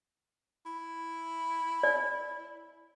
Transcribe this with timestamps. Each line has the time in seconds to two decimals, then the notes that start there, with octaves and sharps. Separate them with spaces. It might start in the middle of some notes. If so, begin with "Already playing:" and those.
0.66 E4
1.83 D5